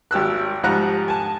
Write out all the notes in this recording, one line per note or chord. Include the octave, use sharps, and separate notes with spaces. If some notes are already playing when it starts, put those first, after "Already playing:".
G#1 G4 E6 F#6
G#2 F3 G3 F#5 A#5 F#6
G#5 A5